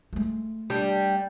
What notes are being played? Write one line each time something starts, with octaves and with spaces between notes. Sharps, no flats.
G#3 A3
G3 D4